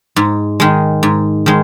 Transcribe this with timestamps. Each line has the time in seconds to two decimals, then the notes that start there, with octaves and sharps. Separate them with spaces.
0.16 G#2
0.60 D#3 G#3
1.03 G#2
1.46 D#3 G#3